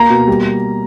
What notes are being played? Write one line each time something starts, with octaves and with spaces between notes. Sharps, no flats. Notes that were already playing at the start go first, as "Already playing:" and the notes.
Already playing: A#3 A#5
B2
G3